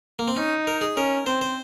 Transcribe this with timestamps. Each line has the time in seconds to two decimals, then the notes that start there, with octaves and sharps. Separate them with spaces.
0.19 A#3
0.28 C4
0.36 C#4 D#4
0.67 A#4
0.81 G#4
0.96 C#4 A#4
1.26 C4 C5
1.41 C5